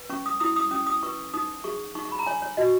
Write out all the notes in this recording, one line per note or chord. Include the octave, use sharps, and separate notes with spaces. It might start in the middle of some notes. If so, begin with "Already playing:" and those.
Already playing: B4
C#4 C#6
D#6
E4 D#6
D#6
C#4 D#6
D#6
B4 C#6
D#4 D#6
G#4 C#6
D#4 C#6
C#6
B5
A#5
C#5 G#5
C#5
F#4 D#5